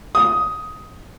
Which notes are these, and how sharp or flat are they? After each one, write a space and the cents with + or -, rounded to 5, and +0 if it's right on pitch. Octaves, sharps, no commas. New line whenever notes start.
D#6 +10